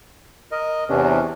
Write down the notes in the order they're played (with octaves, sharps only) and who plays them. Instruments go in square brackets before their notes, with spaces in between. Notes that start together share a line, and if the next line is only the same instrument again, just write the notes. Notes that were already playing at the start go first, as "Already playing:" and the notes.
[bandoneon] A#4 D#5
[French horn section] E2 C3 [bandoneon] C#4 D4